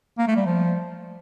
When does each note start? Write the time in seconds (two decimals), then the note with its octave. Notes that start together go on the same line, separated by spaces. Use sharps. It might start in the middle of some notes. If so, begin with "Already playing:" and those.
0.18 A#3
0.27 A3
0.37 G3
0.46 F3